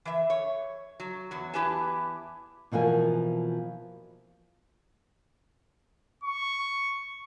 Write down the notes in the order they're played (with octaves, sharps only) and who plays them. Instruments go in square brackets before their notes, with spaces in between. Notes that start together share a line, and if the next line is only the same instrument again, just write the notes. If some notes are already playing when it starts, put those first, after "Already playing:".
[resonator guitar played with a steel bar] E3 E5
C#5
F#3
E2 F#3
E2 E4 G4 B4 G#5 A5
[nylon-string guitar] B2 E3 F3 A#3 G#5
[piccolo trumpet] C#6